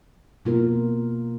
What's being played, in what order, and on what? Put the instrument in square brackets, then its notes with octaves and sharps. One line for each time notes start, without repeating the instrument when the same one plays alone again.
[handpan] B2 A#3 F4 A#4